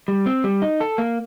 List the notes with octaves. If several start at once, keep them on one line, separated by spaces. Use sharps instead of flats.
G3
C4
G3
D#4
A4
A#3